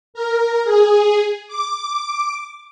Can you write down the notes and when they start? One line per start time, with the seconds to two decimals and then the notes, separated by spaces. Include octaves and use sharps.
0.14 A#4
0.64 G#4
1.48 D6